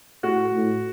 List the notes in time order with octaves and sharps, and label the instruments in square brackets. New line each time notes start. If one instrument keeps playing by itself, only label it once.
[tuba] A2 [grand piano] F#4
[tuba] A2